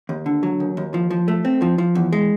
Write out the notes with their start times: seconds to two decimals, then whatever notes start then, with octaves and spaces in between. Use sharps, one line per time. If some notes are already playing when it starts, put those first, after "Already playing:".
0.09 D#2
0.26 D3
0.43 F#3
0.60 D#2
0.77 D#2
0.94 F3
1.10 F3
1.28 A3
1.45 C4
1.62 F3
1.78 F3
1.95 E2
2.13 G#3